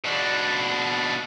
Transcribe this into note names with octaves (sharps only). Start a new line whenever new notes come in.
B2 D4